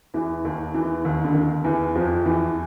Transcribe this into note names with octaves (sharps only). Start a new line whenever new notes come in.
E2 E3
D#2 D#3
E2 E3
D#2 D#3
D3
D#2 D#3
E2 E3
F2 F3
E2 E3